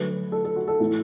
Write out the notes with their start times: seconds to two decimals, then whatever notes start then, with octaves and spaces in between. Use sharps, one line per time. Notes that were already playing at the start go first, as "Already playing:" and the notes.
Already playing: D3 F#3 A3 B4
0.32 A4
0.45 A4
0.56 F#4
0.68 A4
0.80 A2 E3 A3